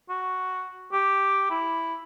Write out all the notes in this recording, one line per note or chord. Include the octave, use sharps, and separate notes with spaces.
F#4
G4
E4